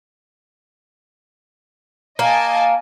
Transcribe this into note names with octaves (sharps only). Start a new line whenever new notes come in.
A#3 D#5 G#5 A5